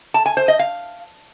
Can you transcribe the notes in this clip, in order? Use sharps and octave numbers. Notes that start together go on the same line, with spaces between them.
A5
G#5
C5
D#5
F5